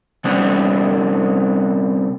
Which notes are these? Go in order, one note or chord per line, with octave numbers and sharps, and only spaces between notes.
C3 G3 B3 C#4 D4